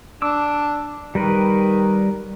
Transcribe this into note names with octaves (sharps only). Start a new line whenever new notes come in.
D4 D6 E6
D#3 G3 A#4 B4